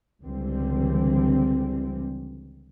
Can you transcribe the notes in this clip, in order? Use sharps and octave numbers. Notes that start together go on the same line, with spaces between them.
C#2 D3 E3 G3 C4